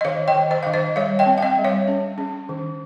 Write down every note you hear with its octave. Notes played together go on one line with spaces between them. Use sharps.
D#5
D#3 C#5 F5
D#5 G5
D#3
C5 D#5
D#3 F5
C5 D#5
G3 C#5 F5
D#5 G5
C4
F5
D#5 G5
G3
C#5 F5
C#4
C#4
D#3